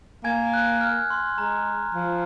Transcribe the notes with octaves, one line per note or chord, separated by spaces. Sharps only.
A#3 G#5 G#6
F#6
F6
C6
G#3 A#5
F3